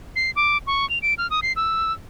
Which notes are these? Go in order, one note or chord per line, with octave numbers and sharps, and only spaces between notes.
C7
D6
C#6
F7
D7
F6
D#6
C7
E6